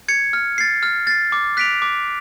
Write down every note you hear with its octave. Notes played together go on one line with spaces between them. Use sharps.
G#6 C#7
F6
A6 C7
F6
A6 C7
D6
F#6 B6 D7 F7
D6